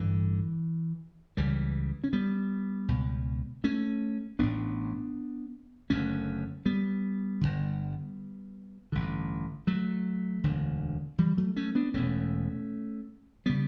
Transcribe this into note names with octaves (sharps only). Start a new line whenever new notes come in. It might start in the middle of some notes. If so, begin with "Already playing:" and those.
Already playing: A1 G2 D3 E3
C#2 C#3 E3 G3
C#4
G3 B3
C#2 B2
A3 C#4
A1 A2 B3 D4
F#1 F#2 D3 A3 C#4
G3 B3
G1 G2 D3
A1 G2 D3
F#3 A3
E1 D2 D3
E3 G3
F#3 A3
A3 C#4
B3 D4
E1 E2 B2 A3 C#4
C#3 G3 B3